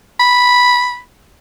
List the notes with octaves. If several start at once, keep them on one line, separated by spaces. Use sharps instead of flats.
B5